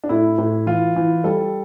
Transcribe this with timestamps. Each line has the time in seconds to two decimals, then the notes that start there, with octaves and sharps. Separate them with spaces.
0.04 D4
0.09 A2 E4
0.38 A2
0.67 E3 F4
0.96 E3
1.24 G3 A4